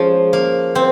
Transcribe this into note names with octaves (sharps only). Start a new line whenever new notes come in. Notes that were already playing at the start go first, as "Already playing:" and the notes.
Already playing: F3 G#3 C#4
A#3
C4